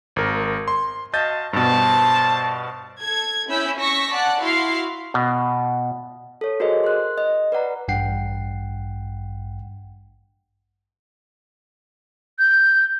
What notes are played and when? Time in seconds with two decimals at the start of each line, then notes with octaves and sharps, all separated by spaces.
0.16 G#1 A#4
0.68 C6
1.13 F#4 D#5 F5 A5 G6 A6
1.53 G2 B2 C5 A5
3.01 A4 G#6
3.48 C#4 E4 B5 E6 G6
3.80 C#6 E6 A#6 B6
4.11 D5 F#5 A5 F#6
4.41 E4 F#4 F5 C6
5.14 B2
6.41 A4 C#5
6.60 F#4 G#4 A#4 C5 D#5
6.84 C6 F#6
7.18 D#5
7.52 B4 D5 F#5 A#5
7.88 A1 G2 F#5 G5 C7
12.39 G6